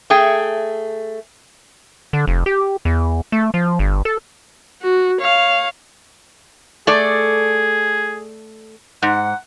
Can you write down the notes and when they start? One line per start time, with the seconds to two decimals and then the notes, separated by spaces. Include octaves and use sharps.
0.10 A3 G#4 G5
2.13 D3
2.27 F1
2.46 G4
2.85 E2
3.32 A3
3.54 F3
3.79 G1
4.05 A4
4.82 F#4
5.21 C#5 F5
6.87 A3 G#4 A4 D5
9.02 G#2 F#5